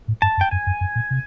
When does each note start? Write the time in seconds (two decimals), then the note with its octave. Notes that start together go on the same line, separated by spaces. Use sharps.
0.08 A2
0.22 G2 A5
0.37 F#2
0.41 G5
0.51 F#2 G#5
0.67 F#2
0.81 F#2
0.95 A#2
1.11 C3